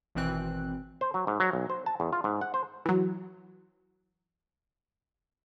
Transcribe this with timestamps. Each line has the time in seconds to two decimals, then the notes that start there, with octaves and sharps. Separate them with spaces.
0.15 G#1 B2 E3 C4 F#6
1.01 C5
1.14 F#3
1.27 G#2
1.40 F#3
1.53 B1
1.70 C5
1.86 A5
2.00 E2
2.13 F4
2.24 G#2
2.41 F#5
2.54 C5
2.86 E3 F#3